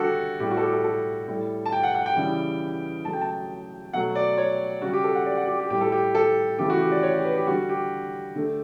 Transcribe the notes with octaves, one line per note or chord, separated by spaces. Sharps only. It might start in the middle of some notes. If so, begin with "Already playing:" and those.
Already playing: D3 G3 F#4 G4 A4
A2 G3 G4
F#4
A4
G4
A4
A4
A2 G3
A5
G5
F#5
F#5
G5
C#3 E3 G3
C#3 F#3 A3 A5
G5
A5
B2 F#3 A3 F#5
D5
C#5
C#3 G3 F#4
G4
A4
F#5
D5
F#5
G4
G4
A2 G3 G4
A4
G4
A4
C#3 E3 A3 G4
F#4
G4
D5
C#5
G4
B4
G4
D3 G3 F#4
G4
D3 A3